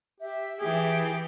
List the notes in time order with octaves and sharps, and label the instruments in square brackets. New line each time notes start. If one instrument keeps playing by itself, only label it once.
[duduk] G4 [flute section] E5
[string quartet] E3 G4 [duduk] G#4